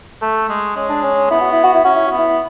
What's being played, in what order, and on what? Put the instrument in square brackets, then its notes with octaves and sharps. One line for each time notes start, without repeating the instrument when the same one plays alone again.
[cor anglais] A3 [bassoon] A4
[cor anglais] G#3
[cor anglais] G#3 [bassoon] C#4
[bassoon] D4
C#4
[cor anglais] B3 [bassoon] E4
[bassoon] F#4
E4
F#4
E4
[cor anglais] C#4 [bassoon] F#4
[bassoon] E4
[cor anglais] B3 [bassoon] F#4
[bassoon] E4